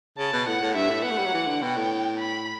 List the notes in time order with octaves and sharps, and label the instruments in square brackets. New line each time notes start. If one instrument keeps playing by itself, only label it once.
[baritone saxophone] C#3 [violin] A5
[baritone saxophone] B2
[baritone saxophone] A2 [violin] F#5
[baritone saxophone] A2
[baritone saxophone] G2 [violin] E5
[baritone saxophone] A2
[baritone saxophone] B3 [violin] F#5
[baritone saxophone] A3
G3
F#3
E3
D3
[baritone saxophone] B2 [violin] G5
[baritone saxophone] A2
[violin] B5